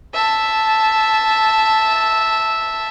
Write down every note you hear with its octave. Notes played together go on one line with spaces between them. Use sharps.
E5 A5